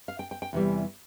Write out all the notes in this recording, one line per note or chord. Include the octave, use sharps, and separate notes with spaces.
F5
G5
G5
G5
E2 C3 E3 G3